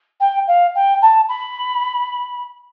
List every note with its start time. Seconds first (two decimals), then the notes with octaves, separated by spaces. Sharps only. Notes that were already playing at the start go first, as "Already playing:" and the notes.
0.20 G5
0.47 F5
0.75 G5
1.02 A5
1.29 B5